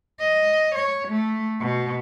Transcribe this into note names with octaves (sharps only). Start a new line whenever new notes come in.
D#5
C#5
A3
B2